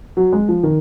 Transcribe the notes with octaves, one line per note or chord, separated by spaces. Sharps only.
F#3
G#3
F3
D#3